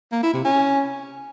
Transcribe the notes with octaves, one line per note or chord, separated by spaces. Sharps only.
A#3
E4
C3
C#4